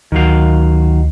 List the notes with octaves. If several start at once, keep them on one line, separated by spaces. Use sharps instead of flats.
D2 D#3 F#3 F5